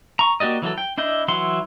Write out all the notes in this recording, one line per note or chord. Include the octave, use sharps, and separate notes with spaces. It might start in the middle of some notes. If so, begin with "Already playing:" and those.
A#5 C#6
A#3 F#4 G4 D5 D#5
E3 F#3 G#3 A4
G5
D4 E4 D#5 G6
E3 F#3 E4 F#5 C6